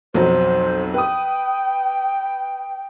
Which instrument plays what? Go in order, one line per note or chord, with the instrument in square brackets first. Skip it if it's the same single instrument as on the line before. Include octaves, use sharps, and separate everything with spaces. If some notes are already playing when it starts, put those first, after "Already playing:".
[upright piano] B1 F2 F#3 [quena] C5
[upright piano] B4 D#6 [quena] G5